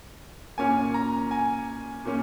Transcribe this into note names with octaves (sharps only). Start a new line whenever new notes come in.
A#2 A#3 C#4 G#5
A#5
G#5
A#2 A#3 C#4